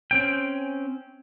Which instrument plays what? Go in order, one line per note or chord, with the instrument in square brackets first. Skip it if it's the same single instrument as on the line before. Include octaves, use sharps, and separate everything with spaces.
[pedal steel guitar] C4 C#4 G5